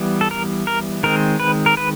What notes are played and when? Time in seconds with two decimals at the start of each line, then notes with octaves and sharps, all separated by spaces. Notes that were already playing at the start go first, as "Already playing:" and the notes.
Already playing: E3 G3 B3
0.21 A4
0.31 A#4
0.67 A#4
1.03 D#3 G#3 C4 A#4
1.40 B4
1.66 A#4
1.77 B4